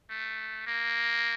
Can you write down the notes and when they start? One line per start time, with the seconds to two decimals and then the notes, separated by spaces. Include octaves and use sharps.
0.10 A3
0.67 A#3